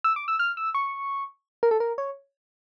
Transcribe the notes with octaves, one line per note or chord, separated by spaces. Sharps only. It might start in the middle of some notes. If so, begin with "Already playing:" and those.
E6
D6
E6
F6
E6
C#6
A#4
A4
A#4
C#5